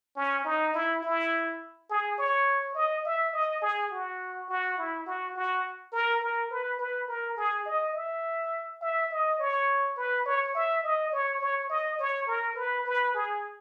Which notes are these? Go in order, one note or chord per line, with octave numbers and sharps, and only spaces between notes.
C#4
D#4
E4
E4
G#4
C#5
D#5
E5
D#5
G#4
F#4
F#4
E4
F#4
F#4
A#4
A#4
B4
B4
A#4
G#4
D#5
E5
E5
D#5
C#5
B4
C#5
E5
D#5
C#5
C#5
D#5
C#5
A#4
B4
B4
G#4